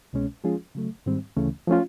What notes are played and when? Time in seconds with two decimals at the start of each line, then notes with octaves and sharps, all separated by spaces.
0.13 C2 B2 G#3 C#4
0.44 F3 G#3 C#4 F4 G#4
0.75 C#3 F#3 A3
1.06 G#2 D#3 G3 C4
1.36 D2 C#3 E3 A3 C#4
1.67 F3 A3 C#4 F4